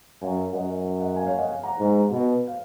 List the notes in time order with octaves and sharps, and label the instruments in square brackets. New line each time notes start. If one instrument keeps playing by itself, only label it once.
[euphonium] F#2 [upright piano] F5 G#5
[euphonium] F#2 [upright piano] D#5 F#5
[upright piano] D#5 F#5
F5 G#5
C#5 F5
D#5 F#5
F5 G#5
F#5 A#5
[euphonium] G#2
B2
[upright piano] F5